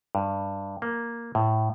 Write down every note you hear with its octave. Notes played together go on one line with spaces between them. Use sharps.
G2
A#3
A2